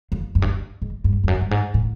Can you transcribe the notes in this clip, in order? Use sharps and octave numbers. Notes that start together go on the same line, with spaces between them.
F2
F#2
G2
F#2
G#2
G2
F2
F#2
G2
G#2
A2